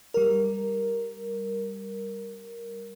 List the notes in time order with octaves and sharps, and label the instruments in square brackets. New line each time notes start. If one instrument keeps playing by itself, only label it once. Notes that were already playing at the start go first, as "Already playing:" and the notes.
[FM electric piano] G3 A#4